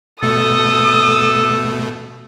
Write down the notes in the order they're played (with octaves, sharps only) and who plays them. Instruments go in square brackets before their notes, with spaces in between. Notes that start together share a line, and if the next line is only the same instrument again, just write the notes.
[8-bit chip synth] B2 A3 [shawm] A4 [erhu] D#6